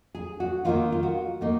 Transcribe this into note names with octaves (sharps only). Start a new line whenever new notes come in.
G#4
F#4
D#3 A#3 D#4 F4
F4
F#4
D#3 A#3 D#4